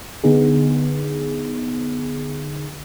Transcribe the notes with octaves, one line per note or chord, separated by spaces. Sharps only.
D3 B3 D#4 G#4